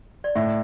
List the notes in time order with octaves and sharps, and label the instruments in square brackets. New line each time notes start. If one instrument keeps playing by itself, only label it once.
[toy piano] D5
[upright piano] A2 [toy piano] E5